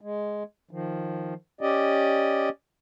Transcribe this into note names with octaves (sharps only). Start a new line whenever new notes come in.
G#3
D#3 F3
C#4 G4 D5 D#5